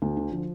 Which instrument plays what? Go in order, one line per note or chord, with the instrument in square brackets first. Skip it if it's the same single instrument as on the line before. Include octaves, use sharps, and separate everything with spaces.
[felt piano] D2
D3
F3